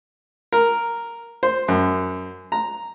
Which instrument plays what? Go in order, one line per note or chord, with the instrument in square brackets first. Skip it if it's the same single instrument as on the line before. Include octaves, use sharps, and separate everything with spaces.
[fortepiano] A#4
C5
F#2
A#5